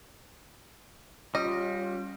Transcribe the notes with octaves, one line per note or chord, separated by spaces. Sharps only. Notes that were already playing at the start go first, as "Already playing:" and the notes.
G3 C#4 F4 D#5